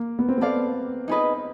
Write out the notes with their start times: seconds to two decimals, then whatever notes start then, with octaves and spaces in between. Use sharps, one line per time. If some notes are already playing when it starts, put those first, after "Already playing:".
Already playing: A#3
0.19 B3
0.29 C4
0.38 B3 A4 D5 F5
1.08 D#4 G#4 B4 D#5